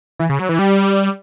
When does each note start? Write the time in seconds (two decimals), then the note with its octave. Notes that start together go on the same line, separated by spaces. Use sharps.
0.19 E3
0.29 C#3
0.39 F#3
0.49 E3
0.59 G3